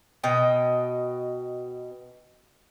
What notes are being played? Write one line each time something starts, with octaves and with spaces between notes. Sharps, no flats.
B2 B3 D#5 G5